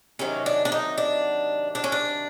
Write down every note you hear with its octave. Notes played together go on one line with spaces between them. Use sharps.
C3 D#3 F#3 C#4
D4
D4
D#4
D4
D4
C#4
D4